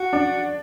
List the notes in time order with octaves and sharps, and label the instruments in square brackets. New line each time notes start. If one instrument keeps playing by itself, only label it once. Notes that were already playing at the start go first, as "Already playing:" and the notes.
Already playing: [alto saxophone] F#4
[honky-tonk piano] D4